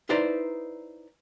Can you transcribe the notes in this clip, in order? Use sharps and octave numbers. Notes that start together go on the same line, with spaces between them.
D#4 E4 B4 C5 D5 A#5